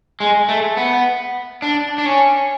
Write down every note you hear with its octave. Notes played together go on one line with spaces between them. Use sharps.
G#3
A3
B3
D4
D4
C#4